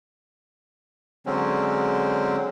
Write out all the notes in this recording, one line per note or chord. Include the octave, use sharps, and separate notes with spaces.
D3 F#3 G#3 C4 C#4